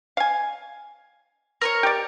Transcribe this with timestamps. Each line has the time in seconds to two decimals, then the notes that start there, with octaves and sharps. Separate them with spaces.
0.17 F5 G#5
1.61 A#4 B4 C#5
1.83 G4 D5